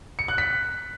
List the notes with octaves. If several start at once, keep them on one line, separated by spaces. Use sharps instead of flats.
C#7
F#6
B6